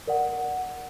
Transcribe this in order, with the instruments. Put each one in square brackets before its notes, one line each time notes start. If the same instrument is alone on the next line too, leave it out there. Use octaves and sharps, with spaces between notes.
[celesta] A#4 D5 F#5